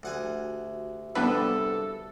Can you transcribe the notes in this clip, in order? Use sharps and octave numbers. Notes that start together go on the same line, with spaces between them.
D2 F#4 G4 E5 F#5 G#5
C2 G2 D3 B3 D4 A4 B4